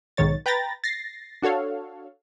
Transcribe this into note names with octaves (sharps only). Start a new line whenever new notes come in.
B1 G#2 D#3 C#5 A6
B4 G5 A#5 B5 A6 A#6
A6 A#6 C7
D4 F#4 A4 C#5 F5